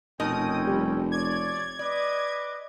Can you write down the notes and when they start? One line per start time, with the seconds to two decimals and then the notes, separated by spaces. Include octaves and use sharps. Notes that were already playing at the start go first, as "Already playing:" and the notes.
0.20 F1 B2 C4 C#4 D#4 A#4 G5 D#6
0.67 G3
1.12 C#5 D5 G#6
1.79 B4 D5 D#5 D6